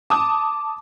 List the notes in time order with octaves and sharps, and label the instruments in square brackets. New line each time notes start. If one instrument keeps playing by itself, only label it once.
[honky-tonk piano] A5 D#6 [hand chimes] D6